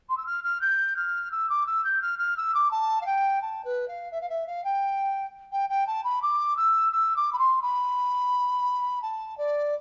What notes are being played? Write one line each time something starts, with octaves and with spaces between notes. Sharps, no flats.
C6
E6
F6
F6
G6
F6
E6
D6
E6
G6
F6
F6
E6
D6
A5
F5
G5
A5
B4
F5
E5
F5
E5
F5
G5
G5
G5
A5
B5
D6
E6
E6
D6
B5
C6
B5
A5
D5